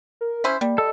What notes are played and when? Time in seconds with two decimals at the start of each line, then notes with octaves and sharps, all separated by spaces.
0.21 A#4
0.44 C#4 E4 C5 B6
0.61 G3 A#3
0.78 A4 D#5